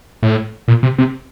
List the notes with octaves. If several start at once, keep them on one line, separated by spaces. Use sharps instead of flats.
A2
A#2
C3
C3